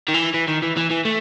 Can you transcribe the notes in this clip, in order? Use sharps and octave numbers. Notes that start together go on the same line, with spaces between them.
D#3
E3
E3
D#3
E3
E3
E3
A3